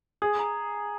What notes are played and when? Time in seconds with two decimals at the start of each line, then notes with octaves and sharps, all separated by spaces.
0.22 G#4 D#6
0.39 A#5